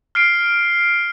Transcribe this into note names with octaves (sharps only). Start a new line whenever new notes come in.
F6 C7 D7